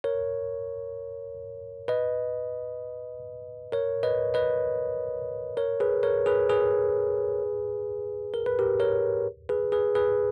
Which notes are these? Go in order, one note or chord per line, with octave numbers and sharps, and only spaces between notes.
A#4 C#5
B4 D#5
A#4 C#5
B4 D#5
B4 D#5
A#4 C#5
G#4 B4
A#4 C#5
G#4 B4
G#4 B4
A#4
B4
G4 A#4
A#4 C#5
G#4 B4
G#4 B4
G#4 B4